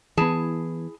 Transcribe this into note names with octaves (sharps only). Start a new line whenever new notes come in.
E3 B3 E4 G#4 A5